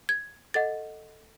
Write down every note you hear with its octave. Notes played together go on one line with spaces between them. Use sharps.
G#6
A4 D#5 F#5 A6